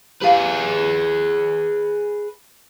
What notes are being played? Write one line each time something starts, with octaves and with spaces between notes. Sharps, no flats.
G4 G#4 B4 F5